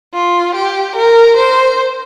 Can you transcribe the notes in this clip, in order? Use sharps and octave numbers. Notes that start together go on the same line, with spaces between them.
F4
G4
A#4
C5